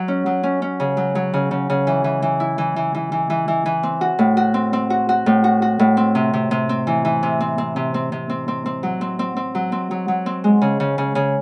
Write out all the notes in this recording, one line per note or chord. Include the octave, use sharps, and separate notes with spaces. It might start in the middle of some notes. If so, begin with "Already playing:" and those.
Already playing: F#3
C#4
F#3
C#4
C#4
C#3
F#3
F#3
C#3
C#3
C#3
E3
E3
E3
E4
E3
E3
E3
E3
E3
E3
E3
C4
F#4
A2
F#4
C4
C4
F#4
F#4
A2
F#4
F#4
A2
C4
C3
C3
C3
C4
E3
E3
C3
C4
C4
C3
C4
C3
C4
C4
C4
F#3
C4
C4
C4
F#3
C4
F#3
F#3
C4
G#3
C#3
C#3
C#3
C#3